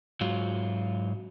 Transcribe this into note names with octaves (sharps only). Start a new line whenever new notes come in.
G#2 F#3 F4